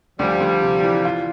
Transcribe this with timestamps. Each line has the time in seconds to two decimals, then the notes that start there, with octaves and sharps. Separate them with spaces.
0.19 D2 F3 G3
0.40 D2
0.62 C3
0.83 E3
1.05 F4